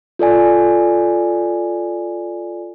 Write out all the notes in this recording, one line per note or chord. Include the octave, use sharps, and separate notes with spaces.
F4 A4 D5 G#5